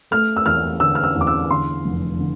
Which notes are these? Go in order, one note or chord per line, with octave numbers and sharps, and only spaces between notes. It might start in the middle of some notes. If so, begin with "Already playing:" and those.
A3 F6
E6
E2 F6
D3 E6
F6
E6
E2
D6
E6
D3 C6
F1
D3